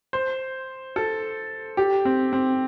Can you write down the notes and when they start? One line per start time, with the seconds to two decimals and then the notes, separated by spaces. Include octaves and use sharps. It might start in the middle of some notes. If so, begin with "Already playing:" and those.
0.13 C5
0.96 A4
1.77 G4
2.05 C4
2.33 C4